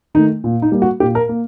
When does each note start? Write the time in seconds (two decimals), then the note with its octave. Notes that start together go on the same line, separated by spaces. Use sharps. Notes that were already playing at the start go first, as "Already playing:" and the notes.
0.14 D#3 A3 D#4
0.44 A#2
0.62 D#4
0.72 G3 A#3
0.82 F#4
1.00 A#2 G4
1.15 A#4
1.29 A#3